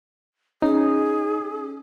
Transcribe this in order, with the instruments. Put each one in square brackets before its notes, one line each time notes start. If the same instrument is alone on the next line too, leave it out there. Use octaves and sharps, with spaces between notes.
[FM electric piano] C#4 [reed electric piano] D#4 [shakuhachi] G#4